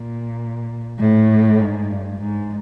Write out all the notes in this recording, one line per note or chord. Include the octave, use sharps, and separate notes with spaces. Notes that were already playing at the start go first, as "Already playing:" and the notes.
Already playing: A#2
A2
G#2
G2
G#2